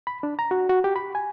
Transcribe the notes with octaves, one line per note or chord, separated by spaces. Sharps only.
B5
D4
A#5
F#4
F#4
G4
B5
G#5